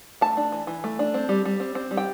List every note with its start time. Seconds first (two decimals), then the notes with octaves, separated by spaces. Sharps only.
0.21 A3 A5
0.37 D4
0.52 E3
0.67 E3
0.84 A3
0.99 D4
1.14 C4
1.29 G3
1.45 G3
1.60 C4
1.75 C4
1.91 G3
1.97 G5